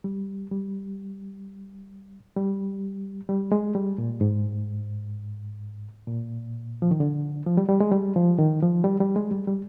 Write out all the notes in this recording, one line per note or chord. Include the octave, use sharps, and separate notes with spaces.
G3
G3
G3
G3
G#3
G3
A#2
G#2
A#2
F3
D#3
D3
F3
G3
G3
G#3
G3
F3
D#3
F3
G3
G3
G#3
G3
G3